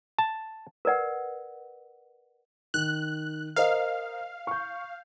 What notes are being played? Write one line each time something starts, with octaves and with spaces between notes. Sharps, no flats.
A5
A#4 B4 D5 F#5
D#3 F#6
A#4 C5 D#5 F5
C#6 G6